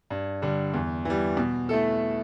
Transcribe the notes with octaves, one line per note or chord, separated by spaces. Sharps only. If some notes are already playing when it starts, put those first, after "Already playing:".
G2
D3 G3
E2
E3 G3
B2
A3 E4 A4